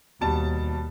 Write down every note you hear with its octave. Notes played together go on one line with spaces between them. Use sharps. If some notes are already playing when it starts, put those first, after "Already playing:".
D#2 B2 G3 A5